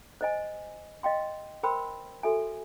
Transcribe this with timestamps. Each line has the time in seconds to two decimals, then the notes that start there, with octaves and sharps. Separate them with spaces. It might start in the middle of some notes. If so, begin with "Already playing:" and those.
0.21 C5 D#5 G#5
1.03 D#5 F5 G5 C6
1.63 A#4 C5 G5 B5 C6 E6
2.23 F#4 A4 E5 G#5